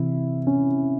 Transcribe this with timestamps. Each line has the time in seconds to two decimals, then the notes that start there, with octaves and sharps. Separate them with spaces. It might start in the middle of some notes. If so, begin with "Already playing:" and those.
Already playing: C3 E3 E4
0.47 C#4